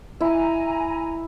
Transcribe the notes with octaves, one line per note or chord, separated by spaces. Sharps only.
E4 G#5 A#5